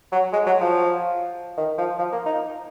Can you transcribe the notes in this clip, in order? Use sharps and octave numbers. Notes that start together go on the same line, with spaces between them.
F#3
G#3
F#3
F3
D#3
F3
F3
A#3
D#4